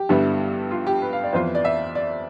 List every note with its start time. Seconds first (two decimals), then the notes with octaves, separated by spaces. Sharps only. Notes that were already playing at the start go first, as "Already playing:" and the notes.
Already playing: G4
0.09 G2 D3 G3 B3 E4
0.71 F4
0.87 G4
1.02 B4
1.13 F5
1.24 D5
1.33 F2 E3 B3 F4 C5
1.55 D5
1.65 E5
1.95 D5